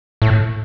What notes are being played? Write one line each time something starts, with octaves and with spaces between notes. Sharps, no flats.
A2